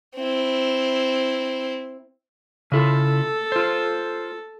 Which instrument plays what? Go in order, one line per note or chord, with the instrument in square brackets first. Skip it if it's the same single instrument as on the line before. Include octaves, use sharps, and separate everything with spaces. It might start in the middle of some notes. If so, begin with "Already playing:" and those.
[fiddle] C4 E4
[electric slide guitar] C#3 E4 F4 [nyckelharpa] A4
[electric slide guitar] F4 C5